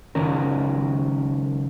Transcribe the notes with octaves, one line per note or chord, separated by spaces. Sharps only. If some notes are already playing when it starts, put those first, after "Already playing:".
C#2 F#2 D#3 C#4 A#4